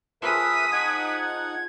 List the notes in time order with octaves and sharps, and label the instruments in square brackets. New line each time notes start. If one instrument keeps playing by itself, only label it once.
[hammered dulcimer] F3 G#4 [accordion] A#4 B4 E5 [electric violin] D#6 B6
[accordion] D#4 F#5 [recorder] G#6